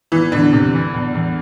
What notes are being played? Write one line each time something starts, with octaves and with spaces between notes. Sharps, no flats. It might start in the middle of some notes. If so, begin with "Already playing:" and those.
E2 E3
E2 D3
C3
E3
E2
E2